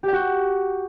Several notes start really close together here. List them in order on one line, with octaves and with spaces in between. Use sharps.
G4 G5 F#4